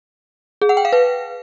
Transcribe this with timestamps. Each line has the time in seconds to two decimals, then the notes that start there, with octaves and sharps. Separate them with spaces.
0.61 G#4
0.69 F#5
0.77 G5
0.85 F5
0.92 B4